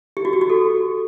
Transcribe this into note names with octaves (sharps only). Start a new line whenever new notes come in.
G4
F#4
G4
F#4
A4